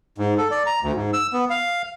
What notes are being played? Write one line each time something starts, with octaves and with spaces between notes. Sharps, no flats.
G#2
A4
D5
A#5
D2
G#2
E6
B3
F5